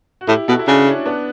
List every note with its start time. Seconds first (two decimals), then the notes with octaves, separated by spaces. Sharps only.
0.21 F#4
0.28 A2 E4 G4
0.48 B2 F#4 A4
0.59 E4
0.67 C#3 D4 F#4
0.86 C#4 E4
1.05 B3 D4